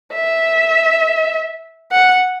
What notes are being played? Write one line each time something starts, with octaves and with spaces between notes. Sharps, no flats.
E5
F#5